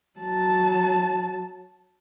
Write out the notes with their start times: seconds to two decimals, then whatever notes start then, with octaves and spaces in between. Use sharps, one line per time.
0.20 F#3 A5